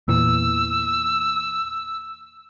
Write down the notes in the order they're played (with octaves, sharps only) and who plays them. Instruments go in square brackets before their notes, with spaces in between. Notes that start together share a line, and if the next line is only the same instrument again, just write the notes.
[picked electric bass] E2 A#2 E3 [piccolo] E6